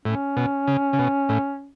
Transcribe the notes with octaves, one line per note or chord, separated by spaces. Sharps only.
A2 C#4
B2
C#3
C#3
B2
A2